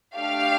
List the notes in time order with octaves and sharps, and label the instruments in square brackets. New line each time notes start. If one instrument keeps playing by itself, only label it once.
[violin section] A3 D4 G4 F5